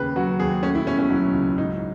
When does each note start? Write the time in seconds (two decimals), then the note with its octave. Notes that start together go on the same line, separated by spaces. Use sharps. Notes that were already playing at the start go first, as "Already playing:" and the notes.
Already playing: D#2 C#3 B4
0.16 F#3 F#4
0.40 D#2 G#4
0.63 A3 C#4
0.75 E4
0.87 B2 C#4
0.99 C#4
1.10 F#3 E4
1.34 C#2
1.58 G#2 D#4